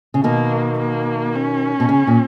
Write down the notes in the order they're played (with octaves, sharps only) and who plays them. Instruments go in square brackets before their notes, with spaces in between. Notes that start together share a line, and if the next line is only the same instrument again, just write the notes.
[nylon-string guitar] C#3
[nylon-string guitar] B2 D#3 [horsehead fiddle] A#3
[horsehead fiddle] A#3
C#4
[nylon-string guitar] B2
C#3
A#2